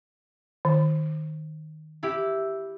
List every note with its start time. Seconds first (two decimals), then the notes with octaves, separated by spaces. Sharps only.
0.65 D#3
2.03 E4 G4